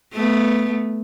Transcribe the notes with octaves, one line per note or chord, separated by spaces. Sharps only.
A3 B3